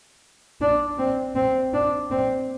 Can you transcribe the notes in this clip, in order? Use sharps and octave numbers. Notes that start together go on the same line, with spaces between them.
D4
C4
C4
D4
C4